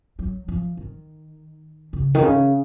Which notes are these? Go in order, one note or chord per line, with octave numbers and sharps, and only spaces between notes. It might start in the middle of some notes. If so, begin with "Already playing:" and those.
F#3
F3
D#3
C#3
D#3
C#3